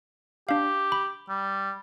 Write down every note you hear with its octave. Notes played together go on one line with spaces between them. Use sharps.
D4 G4 F5
B5
G3